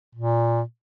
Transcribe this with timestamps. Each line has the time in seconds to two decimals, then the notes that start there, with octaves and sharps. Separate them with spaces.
0.15 A#2